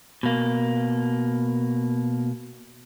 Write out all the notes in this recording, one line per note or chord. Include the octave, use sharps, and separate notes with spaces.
B2 A#3